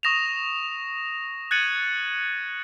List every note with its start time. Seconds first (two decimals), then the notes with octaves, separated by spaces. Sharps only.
0.03 C#6 D#6 A#6 E7 F7
1.51 F#6 G#6 A6 C#7 D#7 F#7